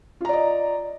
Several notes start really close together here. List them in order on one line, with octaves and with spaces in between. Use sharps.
F4 A#5 D5 D#5